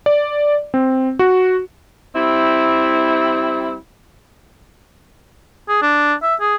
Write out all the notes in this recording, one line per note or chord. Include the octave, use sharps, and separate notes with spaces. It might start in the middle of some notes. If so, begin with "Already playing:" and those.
D5
C4
F#4
G3 C4 E4
G#4
D4
E5
G#4